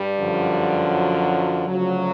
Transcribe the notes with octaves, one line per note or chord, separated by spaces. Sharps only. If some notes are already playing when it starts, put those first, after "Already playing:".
Already playing: G2 G3
F#2 D3 F3
F#3
D2 C#3 F3 F#3